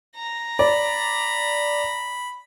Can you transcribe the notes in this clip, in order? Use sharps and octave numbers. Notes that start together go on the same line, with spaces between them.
A#5
D5 B5